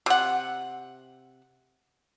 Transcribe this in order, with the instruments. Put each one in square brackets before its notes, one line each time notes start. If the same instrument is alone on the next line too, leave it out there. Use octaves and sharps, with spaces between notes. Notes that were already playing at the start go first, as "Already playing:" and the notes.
[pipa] C3 F#5